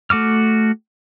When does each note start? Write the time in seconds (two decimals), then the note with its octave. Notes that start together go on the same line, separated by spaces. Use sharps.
0.10 A3 F#4 D6 F6